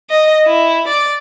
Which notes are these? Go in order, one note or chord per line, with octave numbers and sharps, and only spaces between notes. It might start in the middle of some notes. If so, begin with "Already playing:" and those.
D#5
E4
D5